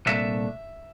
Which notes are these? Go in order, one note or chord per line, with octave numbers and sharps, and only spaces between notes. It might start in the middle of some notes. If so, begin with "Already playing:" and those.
C2 A#2 A3 D4 E5